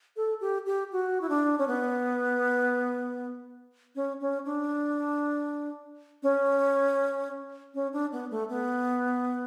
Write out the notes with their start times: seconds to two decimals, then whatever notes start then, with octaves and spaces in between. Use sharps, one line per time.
0.16 A4
0.41 G4
0.66 G4
0.92 F#4
1.21 E4
1.29 D4
1.58 C#4
1.67 B3
3.95 C#4
4.21 C#4
4.45 D4
6.23 C#4
7.74 C#4
7.93 D4
8.12 B3
8.30 A3
8.49 B3